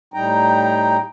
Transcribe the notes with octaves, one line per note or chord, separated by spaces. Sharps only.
A2 G3 D#4 G5 A#5